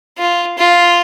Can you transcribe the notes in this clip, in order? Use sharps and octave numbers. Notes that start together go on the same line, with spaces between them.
F4
F4